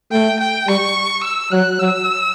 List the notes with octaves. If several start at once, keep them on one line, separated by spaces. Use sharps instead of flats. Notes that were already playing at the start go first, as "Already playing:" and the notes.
A3 G5
G5
G3 C#6
E6
F#3 F#6
F#3 E6